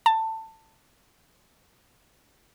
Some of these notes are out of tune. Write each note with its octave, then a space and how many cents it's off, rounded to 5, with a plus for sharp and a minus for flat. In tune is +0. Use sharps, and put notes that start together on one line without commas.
A5 +20